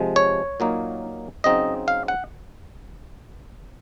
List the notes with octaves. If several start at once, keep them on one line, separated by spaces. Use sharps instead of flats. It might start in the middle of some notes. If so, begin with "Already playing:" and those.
Already playing: C3 F3 G#3
C#5
A#2 F#3 A#3 D#4
C#3 F#3 C4 D#4 D#5
F5
F#5